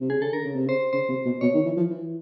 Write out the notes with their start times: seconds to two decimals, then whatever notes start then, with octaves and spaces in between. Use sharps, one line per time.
0.01 C3
0.10 C#3 G#4
0.21 C#3 A4
0.33 D3 A#4
0.45 C#3
0.55 C3
0.66 C#3 C5
0.93 C#3 C5
1.09 C3
1.25 B2
1.41 B2 C#5
1.54 D#3
1.66 E3
1.77 F3
1.90 E3